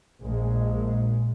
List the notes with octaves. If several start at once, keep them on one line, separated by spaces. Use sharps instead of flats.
A#1 G#3